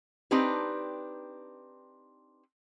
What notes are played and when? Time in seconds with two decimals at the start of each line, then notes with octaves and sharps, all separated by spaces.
0.31 C4 D4 D#4 G4 B4